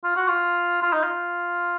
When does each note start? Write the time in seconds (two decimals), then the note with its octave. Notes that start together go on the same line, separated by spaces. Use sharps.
0.04 F4
0.17 F#4
0.28 F4
0.82 F4
0.93 D#4
1.03 F4